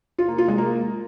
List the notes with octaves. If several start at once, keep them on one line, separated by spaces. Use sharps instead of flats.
F4
A#3
F4
G#3
A#3